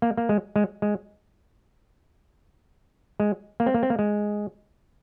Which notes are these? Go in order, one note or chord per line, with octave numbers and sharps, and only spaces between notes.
A#3
A#3
G#3
G#3
G#3
G#3
A#3
C4
A#3
C4
A#3
G#3